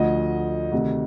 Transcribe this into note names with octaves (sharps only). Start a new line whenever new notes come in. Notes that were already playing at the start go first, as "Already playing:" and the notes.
Already playing: D2 D3 F3 D#5
D2 C3 D#3